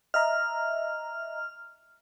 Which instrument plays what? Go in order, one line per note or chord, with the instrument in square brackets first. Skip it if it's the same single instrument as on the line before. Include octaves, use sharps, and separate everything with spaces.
[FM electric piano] D#5 E5 A#5 [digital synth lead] F6